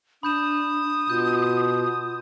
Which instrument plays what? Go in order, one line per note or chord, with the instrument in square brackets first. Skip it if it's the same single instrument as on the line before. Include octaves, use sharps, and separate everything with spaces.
[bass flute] D4 [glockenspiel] B5 G6 E7 [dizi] D#6
[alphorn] B2 [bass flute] F4 [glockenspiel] G6